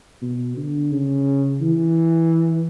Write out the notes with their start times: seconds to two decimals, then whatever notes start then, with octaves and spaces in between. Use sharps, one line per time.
0.22 B2
0.57 D3
0.92 C#3
1.61 E3